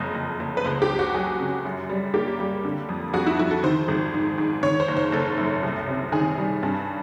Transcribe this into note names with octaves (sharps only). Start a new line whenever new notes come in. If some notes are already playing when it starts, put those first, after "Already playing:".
Already playing: F#1 F2 D#5
F#1
F#1
B4
C#2 C5
G4
C#2
F#4
F#3 G#4
C#3
F#2
G3
A#3 G4
G3
D3
F2
F2 F#4
E4
F2 E4
A4
D#3 C5
G#1
G#2
G#2
D#3 C#5
C5
F#1
C5
F#1 A4
F#2
C2
C3
D#3 G#4
G3
G2